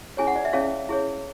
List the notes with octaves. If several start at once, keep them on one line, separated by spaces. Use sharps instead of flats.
C#4 E4 G#4 C#5 G#5
F#5
D5
E5
C#4 E4 G#4 C#5 F5
E4 G#4 C#5